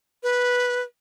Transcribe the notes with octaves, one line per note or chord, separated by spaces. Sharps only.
B4